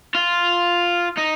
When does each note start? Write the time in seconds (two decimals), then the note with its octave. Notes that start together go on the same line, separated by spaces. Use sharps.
0.15 F4
1.18 D#4